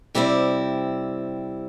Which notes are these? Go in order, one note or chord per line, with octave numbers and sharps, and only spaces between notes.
C3 G3 C4 E4